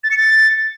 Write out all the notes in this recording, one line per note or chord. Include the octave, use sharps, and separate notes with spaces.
A6
C#7
A6